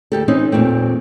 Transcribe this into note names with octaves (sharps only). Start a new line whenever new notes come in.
D2 G4 A4
E3 C4 C#4 D#4
E2 A#2 A3 C4